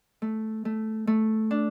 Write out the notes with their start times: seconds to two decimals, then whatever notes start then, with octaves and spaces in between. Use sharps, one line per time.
0.22 A3
0.65 A3
1.07 A3
1.51 D4